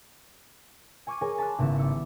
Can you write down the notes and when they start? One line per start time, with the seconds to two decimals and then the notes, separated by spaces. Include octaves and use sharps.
1.07 G#5 C#6 D6 F6 G#6 D#7
1.21 G#4 A#4 C#5 G#5
1.38 A5 B5 C6 D6 F6 F#6
1.58 G#1 C#3 B3 E4 E7
1.78 G3 D6 E6 C#7